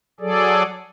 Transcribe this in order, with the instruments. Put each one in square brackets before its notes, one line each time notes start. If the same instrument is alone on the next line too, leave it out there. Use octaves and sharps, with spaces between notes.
[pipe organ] F#3 G#4 A4 D5